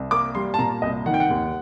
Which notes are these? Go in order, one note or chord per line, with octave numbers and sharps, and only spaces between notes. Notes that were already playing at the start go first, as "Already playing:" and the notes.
Already playing: C2
A#3 D6
G3 C6
A5
A#2 A#5
C2 D#5
D#3 F#5
G5
F#5
D#2